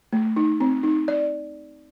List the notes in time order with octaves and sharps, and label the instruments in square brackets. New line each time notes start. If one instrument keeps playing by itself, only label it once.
[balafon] A3
D#4
C4
D#4
D5